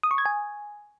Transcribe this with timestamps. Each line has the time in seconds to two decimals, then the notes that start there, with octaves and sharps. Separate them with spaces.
0.03 D#6
0.11 C#6
0.18 G#6
0.26 G#5